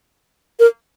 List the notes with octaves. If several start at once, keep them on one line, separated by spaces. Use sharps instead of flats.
A#4